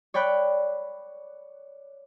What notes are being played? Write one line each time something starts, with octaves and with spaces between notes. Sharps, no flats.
C#5 D5 G5 B5 F#6